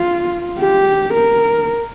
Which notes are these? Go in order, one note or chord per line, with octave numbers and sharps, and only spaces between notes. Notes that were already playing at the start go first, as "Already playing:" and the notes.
Already playing: F4
G4
A#4